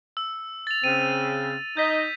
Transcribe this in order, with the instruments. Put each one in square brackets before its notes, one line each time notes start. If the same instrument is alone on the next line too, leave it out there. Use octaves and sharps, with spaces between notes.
[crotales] E6
A6 F7
[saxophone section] C#3 C4 [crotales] D#7
[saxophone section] D#4 D#5 [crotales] G6 B6